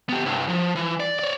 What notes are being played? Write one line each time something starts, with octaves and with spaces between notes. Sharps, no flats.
B3 G4
C2 G2
F3
E3
D5
C#5 D5